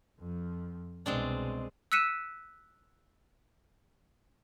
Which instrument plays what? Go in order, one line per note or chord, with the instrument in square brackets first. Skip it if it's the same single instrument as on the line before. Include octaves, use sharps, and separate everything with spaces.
[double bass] F2 F3
[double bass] C2 B2 [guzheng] G#3 C4 D4
[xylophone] E6 F#6 B6 C#7 D#7 E7